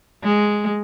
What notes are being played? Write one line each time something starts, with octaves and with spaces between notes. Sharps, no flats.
G#3